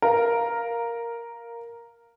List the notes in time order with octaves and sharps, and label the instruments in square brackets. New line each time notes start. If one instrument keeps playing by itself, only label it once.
[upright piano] A#4 F5